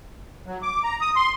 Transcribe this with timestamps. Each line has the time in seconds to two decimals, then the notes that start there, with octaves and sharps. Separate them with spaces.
0.46 F#3
0.62 D6
0.84 A#5
1.01 D#6
1.16 C6